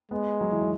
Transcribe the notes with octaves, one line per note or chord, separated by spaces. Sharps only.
G#3 B3
F#3
E3
F#3